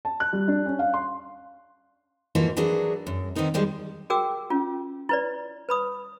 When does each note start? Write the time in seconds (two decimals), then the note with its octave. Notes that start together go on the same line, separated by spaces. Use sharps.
0.05 A5
0.20 F#6
0.33 G3
0.48 D4
0.66 C#4
0.79 F5
0.94 C6
2.35 G#2 E3 F3 A#3 F4 F#4
2.57 E3 F#3 D4 F#4 G#4 A#4
3.07 F#2
3.35 D#3 B3 C4 D#4 A#4
3.54 D#3 F3 G3 G#3
4.10 F#4 G#4 A#4 G5 D6 E6
4.50 C#4 F4
5.09 E4 B4 D5
5.69 B4 B5 D#6